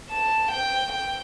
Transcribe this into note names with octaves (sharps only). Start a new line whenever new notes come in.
A5
G5
G5